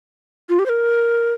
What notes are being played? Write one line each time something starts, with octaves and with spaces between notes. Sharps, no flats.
F4
G4
C5
A#4